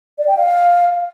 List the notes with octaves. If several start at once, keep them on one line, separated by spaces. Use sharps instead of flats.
D5
G5
F5